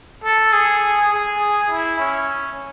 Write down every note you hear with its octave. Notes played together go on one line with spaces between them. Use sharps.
A4
G#4
G#4
E4
C#4